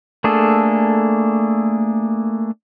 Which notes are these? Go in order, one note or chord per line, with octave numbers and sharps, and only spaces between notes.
A3 A#3 D4 G#4 A4